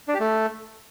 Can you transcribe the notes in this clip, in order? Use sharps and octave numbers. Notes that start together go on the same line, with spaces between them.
D4
G4
A3